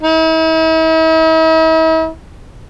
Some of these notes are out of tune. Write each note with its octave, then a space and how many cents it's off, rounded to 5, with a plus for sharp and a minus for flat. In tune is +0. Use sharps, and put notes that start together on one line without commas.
E4 -45